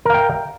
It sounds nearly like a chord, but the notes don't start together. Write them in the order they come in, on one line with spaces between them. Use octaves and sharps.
A#4 F5 G5